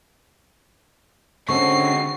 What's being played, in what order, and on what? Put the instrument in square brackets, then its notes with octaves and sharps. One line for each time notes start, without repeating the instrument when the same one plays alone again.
[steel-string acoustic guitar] D3 C4 C#4 [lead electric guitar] G#3 F#4 [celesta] C#6 [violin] C7